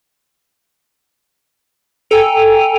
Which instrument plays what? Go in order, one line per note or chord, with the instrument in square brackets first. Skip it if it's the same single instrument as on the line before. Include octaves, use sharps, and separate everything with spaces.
[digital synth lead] A4 [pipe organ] G5 G#5 A#5